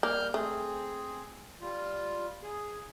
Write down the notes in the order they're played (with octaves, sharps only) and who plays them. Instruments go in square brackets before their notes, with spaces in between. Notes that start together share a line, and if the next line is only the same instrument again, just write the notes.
[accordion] G3 F6 G6 [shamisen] A#3
[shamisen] A3 [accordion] C4 G#4
[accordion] G3 F4
G#4